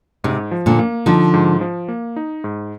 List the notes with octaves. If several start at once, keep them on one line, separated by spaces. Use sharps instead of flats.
G#2 C3
F3
A#2 D3
A#3
D3 F3 D#4
G#2
F3
A#3
D#4
G#2